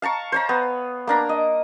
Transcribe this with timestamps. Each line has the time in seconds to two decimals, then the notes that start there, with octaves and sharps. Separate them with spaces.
0.02 F5 A5 A#5 C#6
0.32 C5 C#5 A#5
0.49 B3
1.07 A#3 D4 A#5
1.29 D#5